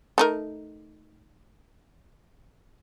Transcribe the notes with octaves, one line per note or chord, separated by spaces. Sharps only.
A3 D#4 A#4